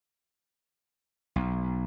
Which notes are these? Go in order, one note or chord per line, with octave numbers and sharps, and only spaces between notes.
B1